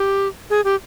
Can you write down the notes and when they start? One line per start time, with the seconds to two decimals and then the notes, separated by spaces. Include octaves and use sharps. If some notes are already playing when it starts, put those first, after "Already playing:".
Already playing: G4
0.50 G#4
0.65 G4